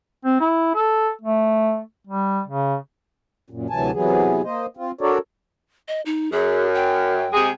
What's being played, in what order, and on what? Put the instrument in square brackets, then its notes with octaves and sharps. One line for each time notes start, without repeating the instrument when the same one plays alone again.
[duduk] C4
E4
A4
A3
G3
C#3
[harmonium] F#2 A#2
D2 C3 E3 F#3 G#5 A5
C3 E3 F#3 B3 G#4
A#3 C5 D#5
C4 F4
D4 F#4 A4 A#4 C#5 D5
[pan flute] D#5
D#4
[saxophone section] F#2 [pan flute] G#4
[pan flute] G5
[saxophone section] C3 G#3 G#4